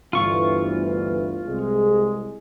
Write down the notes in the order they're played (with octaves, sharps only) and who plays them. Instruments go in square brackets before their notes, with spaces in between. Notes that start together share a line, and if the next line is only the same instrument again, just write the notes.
[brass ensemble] G1 D2 E3 [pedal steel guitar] F4 C#6
[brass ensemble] C2 G#3 G#4